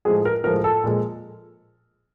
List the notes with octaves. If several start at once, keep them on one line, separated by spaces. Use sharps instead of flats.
A2 F3 G#3 G#4
A#4
A2 F3 G#3 A#4
A4
A#2 F3 G#3